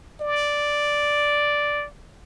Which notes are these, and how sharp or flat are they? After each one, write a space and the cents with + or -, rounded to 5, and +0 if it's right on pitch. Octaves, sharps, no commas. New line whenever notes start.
D5 +0